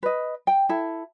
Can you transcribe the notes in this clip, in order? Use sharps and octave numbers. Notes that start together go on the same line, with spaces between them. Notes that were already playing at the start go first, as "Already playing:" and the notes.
B4 D#5
G5
E4 A4